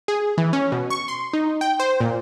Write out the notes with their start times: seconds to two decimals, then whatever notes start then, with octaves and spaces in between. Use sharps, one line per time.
0.08 G#4
0.38 E3
0.53 C#4
0.72 B2
0.90 C#6
1.08 C6
1.33 D#4
1.61 G5
1.80 C5
2.01 A#2